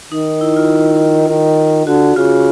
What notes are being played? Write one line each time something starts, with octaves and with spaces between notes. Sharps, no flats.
D#3 D#4
E4
F4
D#3
D3 F#4
C#3 F4